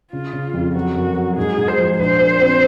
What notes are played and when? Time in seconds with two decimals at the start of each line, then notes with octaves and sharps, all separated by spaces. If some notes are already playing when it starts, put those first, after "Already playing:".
0.12 C#3 F4
0.33 C#3
0.54 F2
0.75 F#3 F#4
0.95 F#2
1.16 F#3
1.37 G#2 G#4
1.58 G#2
1.68 C5
1.79 F3
1.99 A#1 C5
2.20 A#2
2.41 C4